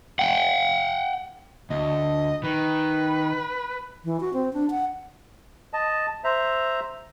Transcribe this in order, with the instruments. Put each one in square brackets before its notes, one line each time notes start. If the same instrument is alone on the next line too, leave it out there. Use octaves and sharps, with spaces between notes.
[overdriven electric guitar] F#5 G5
[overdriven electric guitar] D2 [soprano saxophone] D#5
[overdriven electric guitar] D#3 [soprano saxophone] B4
[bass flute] E3
F#4
C4
D4
F#5
[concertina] D#5 A5
C5 E5 A#5